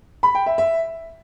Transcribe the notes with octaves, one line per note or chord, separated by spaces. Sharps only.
B5
G5
E5
E5